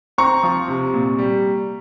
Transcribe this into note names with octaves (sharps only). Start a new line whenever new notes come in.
C4 A#5 C#6
F3
C3
A#2
G3